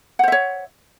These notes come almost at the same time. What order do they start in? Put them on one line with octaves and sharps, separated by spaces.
F#5 C5 E5 C#5